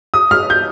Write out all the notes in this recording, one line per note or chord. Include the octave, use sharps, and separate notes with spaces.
D#6
F6
G6